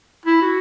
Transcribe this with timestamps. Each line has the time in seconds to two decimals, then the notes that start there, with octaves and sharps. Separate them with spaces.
0.26 E4
0.42 F#4